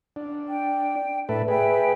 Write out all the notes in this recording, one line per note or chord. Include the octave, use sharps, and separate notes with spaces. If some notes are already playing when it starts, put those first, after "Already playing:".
D4
G5
A2 A4 B4 D5 E5
G#4 B4 E5 G5